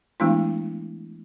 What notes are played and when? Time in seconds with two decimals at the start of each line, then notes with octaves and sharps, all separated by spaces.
0.20 E3 G#3 A3 B3 D4 E4